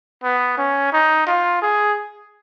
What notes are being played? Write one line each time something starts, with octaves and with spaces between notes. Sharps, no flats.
B3
C#4
D#4
F4
G#4